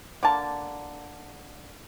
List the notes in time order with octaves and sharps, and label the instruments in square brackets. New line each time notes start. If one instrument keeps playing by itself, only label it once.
[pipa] D3 A#3 A5